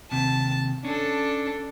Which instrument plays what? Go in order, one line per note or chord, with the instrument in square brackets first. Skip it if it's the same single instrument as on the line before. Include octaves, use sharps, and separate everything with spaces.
[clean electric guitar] D#2 C3 [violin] A5
[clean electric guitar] C#4 [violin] D4 A4